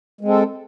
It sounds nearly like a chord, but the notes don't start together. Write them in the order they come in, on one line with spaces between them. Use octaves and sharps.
G#3 C4 A4